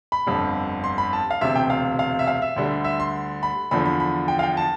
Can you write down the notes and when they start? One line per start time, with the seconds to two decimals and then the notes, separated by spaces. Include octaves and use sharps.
0.12 B5
0.27 G1 F2 D3 G3
0.84 C6
0.98 B5
1.13 A5
1.31 F5
1.41 E1 D2 C3 E5
1.56 G5
1.70 F5
1.99 F5
2.19 E5
2.27 F5
2.42 E5
2.56 D2 D3 G3
2.84 E5
3.00 C6
3.43 B5
3.71 E2 D3 F3 B5
3.86 B5
4.00 B5
4.28 G5
4.39 F5
4.43 G5
4.57 A5